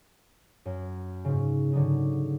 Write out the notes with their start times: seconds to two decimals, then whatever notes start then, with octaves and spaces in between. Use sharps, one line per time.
0.65 F#2
1.25 G#2 C#3
1.73 G#2 D3 F#3 D#4